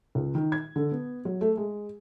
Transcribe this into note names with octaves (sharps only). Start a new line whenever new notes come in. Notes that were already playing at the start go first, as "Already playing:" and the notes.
C#2
D#3
G#6
D3
B3
F#3
A3
G#3